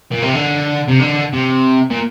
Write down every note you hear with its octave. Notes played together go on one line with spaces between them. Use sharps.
A#2
C3
D3
C3
D3
C3
A#2